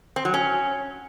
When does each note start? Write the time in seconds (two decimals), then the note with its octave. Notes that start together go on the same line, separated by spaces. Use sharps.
0.16 C4
0.25 F#3
0.34 C#4